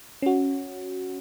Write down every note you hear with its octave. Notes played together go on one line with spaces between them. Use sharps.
C#4 F#4